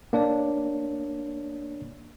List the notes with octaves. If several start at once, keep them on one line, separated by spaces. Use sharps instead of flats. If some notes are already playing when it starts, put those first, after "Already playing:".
A#3 D4 C#5 D5